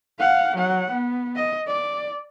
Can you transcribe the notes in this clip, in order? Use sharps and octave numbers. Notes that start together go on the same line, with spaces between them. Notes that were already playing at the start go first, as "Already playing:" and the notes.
F5 F#5
F#3 F#5
B3
D#5
D5